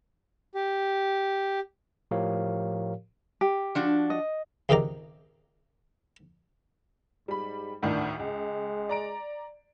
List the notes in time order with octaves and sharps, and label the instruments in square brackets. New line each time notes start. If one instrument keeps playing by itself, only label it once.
[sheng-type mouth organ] G4
[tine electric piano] A2 F3 G4 A#4 C#5 F5
[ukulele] G4
[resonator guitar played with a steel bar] F3 D4 F#4
[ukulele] D#5
[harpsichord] C#2 G#2 C3 D#3 D5 A#5
[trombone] G#2 [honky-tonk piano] G3 B5
[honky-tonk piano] D2 A2 D#3 [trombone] D4
[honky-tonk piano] C#2 [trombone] G#3
[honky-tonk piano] D5 A#5 D7